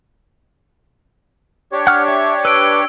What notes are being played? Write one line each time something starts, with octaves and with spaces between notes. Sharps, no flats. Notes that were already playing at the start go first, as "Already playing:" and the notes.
D4 G4 C#5
F#5 F6
E5
B4 E6 D7